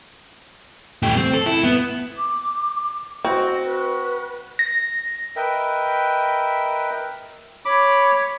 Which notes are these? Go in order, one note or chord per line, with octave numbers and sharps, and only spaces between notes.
A3 G4
C4
A4
E4
B3
D6
C4 F#4 D#5
B4
A#6
A#4 B4 D#5 E5 G5
C#5 B5 D6